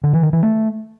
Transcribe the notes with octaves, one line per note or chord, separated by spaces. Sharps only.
D3
E3
D#3
E3
A3